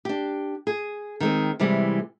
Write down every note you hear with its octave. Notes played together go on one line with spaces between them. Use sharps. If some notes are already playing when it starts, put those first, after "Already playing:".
D4 G4
G#4
D#3 G#3 C4
C3 E3 G3 G#3